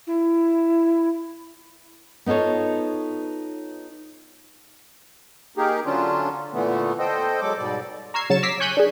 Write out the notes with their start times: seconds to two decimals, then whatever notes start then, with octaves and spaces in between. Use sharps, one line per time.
0.07 E4
2.26 B3 D#4 F4 A4 C#5
5.57 A#3 D#4 G4 G#4 A#4
5.86 D3 F#3 C#4 D4 F4
6.53 A#2 D3 E3 A3 B3
6.99 A4 C5 D#5 G5
7.41 F#3 G#3 A4 D6
7.58 G#2 B2 G3 D5
8.14 A#5 C#6 E6 F6 G#6 C7
8.30 C#3 F#3 A6 C#7 E7
8.43 A#5 D6 E6 B6 C7
8.60 G#5 C#6 F#6 G6 B6 D#7
8.77 D4 G#4